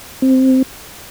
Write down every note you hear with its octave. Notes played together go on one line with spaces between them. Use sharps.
C4